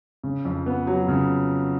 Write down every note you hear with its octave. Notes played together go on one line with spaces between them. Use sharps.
C#3
F2
B3
F#3
C#3